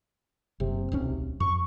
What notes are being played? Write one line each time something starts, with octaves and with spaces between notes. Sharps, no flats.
F#1 C3
D1 B1 C#4
F2 C#6